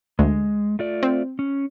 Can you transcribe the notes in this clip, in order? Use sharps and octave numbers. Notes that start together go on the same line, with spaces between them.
D2 G#3
A3 F4 D5
C4
C#4